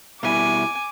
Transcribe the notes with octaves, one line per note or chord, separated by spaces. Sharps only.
B2 G3 E4 G#5 D6